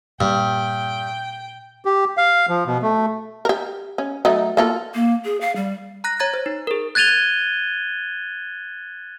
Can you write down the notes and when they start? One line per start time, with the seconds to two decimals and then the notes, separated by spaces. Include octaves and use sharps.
0.21 G2 A#2 G3 G5
1.85 G4
2.17 F5
2.49 F3
2.66 B2
2.82 A3
3.45 G4 A#4
3.98 C#4
4.25 F#3 A3 D#4
4.57 A#3 F4 A4
4.94 A#3
5.25 G#4
5.41 F5
5.56 G3
6.04 A#5 F#6 A#6
6.19 C#5 A#5 G#6 A6
6.34 C5
6.46 D#4
6.67 G#4 A#4
6.95 F#6 G#6 A6 D#7 F7 G7